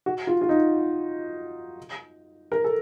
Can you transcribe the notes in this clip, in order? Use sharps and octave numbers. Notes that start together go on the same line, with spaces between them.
F#4
F4
F4
D#4
A#4
A4